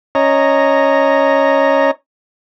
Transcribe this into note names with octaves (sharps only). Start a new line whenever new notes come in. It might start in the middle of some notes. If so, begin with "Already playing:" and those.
C#4 C#5 D#5 A#5